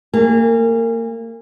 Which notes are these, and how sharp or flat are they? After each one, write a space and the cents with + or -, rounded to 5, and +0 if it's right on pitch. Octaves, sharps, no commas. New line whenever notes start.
A#3 -30 G#4 -30